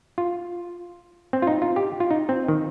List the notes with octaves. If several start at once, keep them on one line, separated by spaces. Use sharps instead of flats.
F4
C4
F4
D#4
F4
G4
F4
D#4
C4
D#3